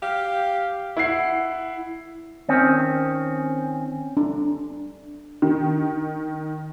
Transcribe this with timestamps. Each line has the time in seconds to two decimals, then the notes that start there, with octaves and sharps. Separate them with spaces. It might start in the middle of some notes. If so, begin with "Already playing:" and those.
0.01 G4 F5
0.97 E4 F#5 C7
2.49 D#3 C4 C#4
4.17 D4
5.42 D#3